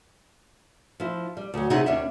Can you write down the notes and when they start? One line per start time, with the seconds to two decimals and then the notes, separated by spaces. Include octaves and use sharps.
1.00 F3 E4
1.37 G3
1.54 D2 F#3
1.70 C3 D#4 E4 G#4 F#5
1.86 D#2 C#4 D4 E5